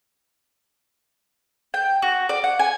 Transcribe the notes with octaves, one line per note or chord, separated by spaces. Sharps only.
G5
F#4
D5
F#5
G#5